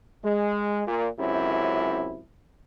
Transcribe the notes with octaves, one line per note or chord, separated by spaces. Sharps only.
G#3
A#2
C#2 F#2 C3 E4